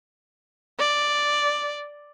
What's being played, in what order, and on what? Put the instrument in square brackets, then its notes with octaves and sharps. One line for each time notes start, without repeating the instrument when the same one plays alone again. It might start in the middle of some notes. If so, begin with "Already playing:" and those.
[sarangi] D5